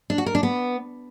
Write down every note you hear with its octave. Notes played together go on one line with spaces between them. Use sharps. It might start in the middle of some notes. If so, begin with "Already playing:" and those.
D4
F#4
A#4
D4
B3